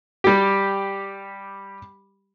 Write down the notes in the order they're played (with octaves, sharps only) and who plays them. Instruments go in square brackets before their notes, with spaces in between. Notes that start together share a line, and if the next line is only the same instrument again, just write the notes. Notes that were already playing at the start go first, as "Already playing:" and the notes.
[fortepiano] G3 G4